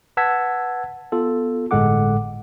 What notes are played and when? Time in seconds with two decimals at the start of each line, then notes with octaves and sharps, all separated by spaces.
0.17 B4 F#5 A5 E6 G#6 B6
1.12 B3 F4 A4
1.71 G1 A2 G#3 A4 F#5 D6